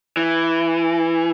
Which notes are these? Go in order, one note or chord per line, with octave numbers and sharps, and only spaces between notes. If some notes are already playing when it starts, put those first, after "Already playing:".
E3